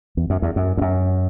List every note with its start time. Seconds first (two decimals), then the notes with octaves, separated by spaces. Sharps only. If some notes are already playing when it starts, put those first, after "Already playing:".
0.17 E2
0.30 F#2
0.42 E2
0.56 F#2
0.77 E2
0.81 F#2